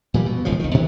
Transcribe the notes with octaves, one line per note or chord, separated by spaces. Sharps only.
A#2 E3 G3
B2
E1 C#2 A2 F3
C2 D#3
G2 B2 D#3 E3